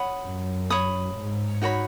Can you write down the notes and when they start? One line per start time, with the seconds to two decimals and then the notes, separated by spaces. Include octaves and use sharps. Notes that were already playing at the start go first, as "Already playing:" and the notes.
Already playing: C#5 F#5 B5 D#6
0.24 F#2
0.70 C#5 B5 D#6
1.15 G#2
1.62 D#4 F#4 C#5 B5